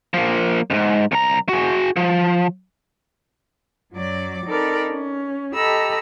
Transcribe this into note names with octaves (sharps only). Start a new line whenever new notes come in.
F3 A#3
F2 G#2
C2 A#5
F#4 G#4
F3
F#2 F#3 D5 D6
C4 D#4 A4 A#4 D5 B5
C#4
G4 A4 D#5 A#5 B5 E6